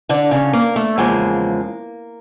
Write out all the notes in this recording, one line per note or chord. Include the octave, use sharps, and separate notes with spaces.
D3 D4
C#3 C#4
A#3
A3
E2 C#3 F3 G#3 A#3